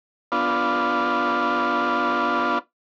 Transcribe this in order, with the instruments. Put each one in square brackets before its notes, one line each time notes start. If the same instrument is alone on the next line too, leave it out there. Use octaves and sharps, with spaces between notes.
[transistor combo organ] B3 D4 F4